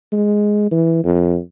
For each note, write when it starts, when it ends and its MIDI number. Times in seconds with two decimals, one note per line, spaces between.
0.12 0.69 56
0.71 1.00 52
1.04 1.38 41